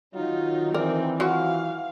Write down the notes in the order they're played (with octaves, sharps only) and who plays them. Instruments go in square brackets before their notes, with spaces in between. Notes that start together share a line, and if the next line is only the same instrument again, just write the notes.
[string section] D#3 D#4 [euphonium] F#3 [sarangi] F4
[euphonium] E3 [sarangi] C4 [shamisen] A#4 D5
[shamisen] F#3 F4 F#4 [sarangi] F5